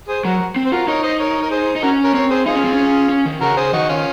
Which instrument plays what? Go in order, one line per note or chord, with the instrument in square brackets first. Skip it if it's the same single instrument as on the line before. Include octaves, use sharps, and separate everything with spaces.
[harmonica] G#4 C5
[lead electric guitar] F#3 [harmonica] F#4 A#4
[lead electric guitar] C4
[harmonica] C5
[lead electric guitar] F4 [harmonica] F#4 A#4
[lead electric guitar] D#4 [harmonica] A#4 C#5
[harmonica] C5 D#5
A#4 C#5
A#4
G#4 C5
[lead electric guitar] D#4
[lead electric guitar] C#4 [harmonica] F#4 A#4
[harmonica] A#4 C#5
[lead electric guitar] C4 [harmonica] A#4 C#5
[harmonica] G#4 C5
[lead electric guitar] D#4 [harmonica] F4 G#4
[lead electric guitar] C#4
C4
C#4
C#4
D#3
[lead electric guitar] C#3 [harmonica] F#4 A#4
[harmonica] G#4 C5
[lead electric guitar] D#3 [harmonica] D#4 F#4
[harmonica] C#4 F4